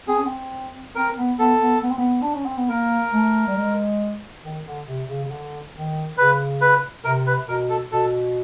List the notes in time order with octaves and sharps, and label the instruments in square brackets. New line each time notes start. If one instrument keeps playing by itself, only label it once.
[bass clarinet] C4 [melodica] G#4
[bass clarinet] C#4
C4
[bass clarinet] C4 [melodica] A#4
[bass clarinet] B3
[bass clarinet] B3 [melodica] A4
[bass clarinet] B3
B3
C4
B3
D4
C#4
C4
B3
[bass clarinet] A#3 [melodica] A#4
[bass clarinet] A3
G3
G#3
D#3
D3
C3
C#3
C#3
D3
D#3
[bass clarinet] C#3 [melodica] B4
[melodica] B4
[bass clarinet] C3 [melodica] A#4
[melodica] B4
[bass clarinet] B2 [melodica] A#4
[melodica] A4
[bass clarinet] B2 [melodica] A4